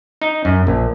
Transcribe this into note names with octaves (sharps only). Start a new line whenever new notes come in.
D#4
F#2
A#1